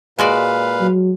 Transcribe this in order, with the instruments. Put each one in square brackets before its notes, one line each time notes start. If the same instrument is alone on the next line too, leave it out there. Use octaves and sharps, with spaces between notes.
[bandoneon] A#2 B4 F5 [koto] G#3 F#4 D5
[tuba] F#3